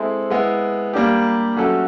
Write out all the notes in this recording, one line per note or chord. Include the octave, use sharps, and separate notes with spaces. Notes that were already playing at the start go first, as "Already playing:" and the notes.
Already playing: G#3 C4 E4 A4 C5
G#3 B3 E4
G3 A#3 D4 G4
F#3 A3 C#4 F#4 A4